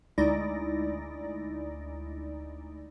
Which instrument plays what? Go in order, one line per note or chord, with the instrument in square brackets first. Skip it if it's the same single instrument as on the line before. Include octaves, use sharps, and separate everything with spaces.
[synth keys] D2 G#3 D#4 E4 D5 A#6